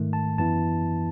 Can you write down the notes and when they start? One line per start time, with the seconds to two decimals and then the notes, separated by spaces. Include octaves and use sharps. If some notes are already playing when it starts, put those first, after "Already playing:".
Already playing: G#2 D#3 A3
0.13 A5
0.38 F#2 E3 B3 E4 A5